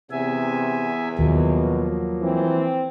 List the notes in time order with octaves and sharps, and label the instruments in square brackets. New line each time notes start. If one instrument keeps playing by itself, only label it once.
[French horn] E2 [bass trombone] C3 [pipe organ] B3 E5 G#5
[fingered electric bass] D#2 [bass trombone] B2 [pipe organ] F3 F#3 A#3
[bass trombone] E3 [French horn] C4